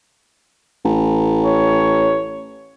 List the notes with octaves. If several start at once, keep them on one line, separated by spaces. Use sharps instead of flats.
A1
C#5